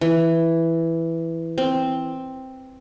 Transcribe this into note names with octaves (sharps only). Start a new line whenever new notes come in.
E3
C4